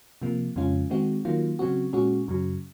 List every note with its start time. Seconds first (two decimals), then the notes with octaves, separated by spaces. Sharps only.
0.22 C3 F3 A#3
0.56 F2 C#3 G#3 C#4 F4
0.90 D#3 G#3 C4 F#4
1.25 D#3 F#3 A#3 F4
1.59 C#3 F#3 C4 F#4
1.93 A#2 G#3 C#4 F#4
2.28 F#2 C#3 F#3